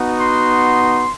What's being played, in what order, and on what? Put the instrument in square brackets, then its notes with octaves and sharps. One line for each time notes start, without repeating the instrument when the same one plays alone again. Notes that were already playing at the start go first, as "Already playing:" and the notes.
Already playing: [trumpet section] B3 D#4 F#4
C6